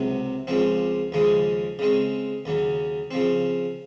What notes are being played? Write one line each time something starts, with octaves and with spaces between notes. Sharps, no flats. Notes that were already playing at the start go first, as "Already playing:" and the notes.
Already playing: C#2 C3 F#3
C#2 C#3 F3 C4
D#2 C#3 F3 G#3
C#3 G#3 C4
D#2 C#3 F#3
C#3 F3 C4